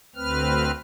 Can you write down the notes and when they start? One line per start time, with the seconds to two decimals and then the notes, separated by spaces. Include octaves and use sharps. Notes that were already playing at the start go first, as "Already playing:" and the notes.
0.16 D2 C4 B4 F6